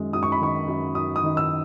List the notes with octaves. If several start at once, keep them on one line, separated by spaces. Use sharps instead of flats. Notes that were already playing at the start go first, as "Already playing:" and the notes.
Already playing: F#2 D#3 G#3
F#2 D#6
C#6
B5
D#3 C#6
F#2
F#2 D#6
D#6
D#3
E6